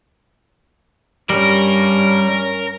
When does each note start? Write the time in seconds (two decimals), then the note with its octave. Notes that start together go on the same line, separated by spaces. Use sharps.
1.30 G2 G3 C#4 A#4